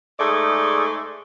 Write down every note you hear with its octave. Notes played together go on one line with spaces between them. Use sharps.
G#2 A3 G#4 D5